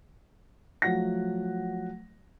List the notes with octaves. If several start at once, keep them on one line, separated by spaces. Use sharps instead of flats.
F3 F#3 A3 F#5 A#6